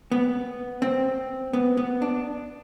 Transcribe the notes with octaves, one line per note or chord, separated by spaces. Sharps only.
B3
C4
B3
B3
D4